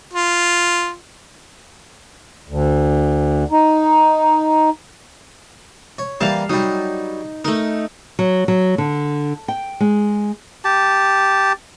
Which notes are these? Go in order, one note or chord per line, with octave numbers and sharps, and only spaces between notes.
F4
D2
D#4
C#5
E3 G3 A#3 F5 A5
F#3 G3 D#4
A3 D#4 A#4
F#3
F#3
D3
G5
G#3
G4 A5